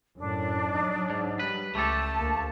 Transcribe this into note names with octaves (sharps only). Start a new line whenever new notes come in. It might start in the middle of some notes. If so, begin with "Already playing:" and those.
F#2 A2 D4
F#3 D#4
G#2
G3 B4
C#2 A3 G4 A4 A5
D2 A#3